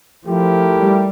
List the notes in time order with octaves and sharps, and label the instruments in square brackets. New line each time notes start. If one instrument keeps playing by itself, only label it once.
[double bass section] F3 [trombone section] A3 E4 G4 A#4
[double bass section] G3